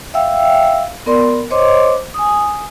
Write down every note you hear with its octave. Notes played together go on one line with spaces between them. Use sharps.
E5 F5 G5 E6
B3 A#4 D5 C6
C5 C#5 D#5 C6 D6
G#5 D#6